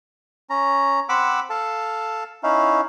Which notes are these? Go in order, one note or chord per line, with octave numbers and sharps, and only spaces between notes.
C#4 A#5
C4 F#5 B5 D6 E6
A4 F5 A5
C#4 D#4 E4 F5